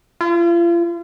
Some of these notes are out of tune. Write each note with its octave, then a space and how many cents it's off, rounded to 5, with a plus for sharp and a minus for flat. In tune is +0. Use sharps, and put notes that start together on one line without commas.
F4 -40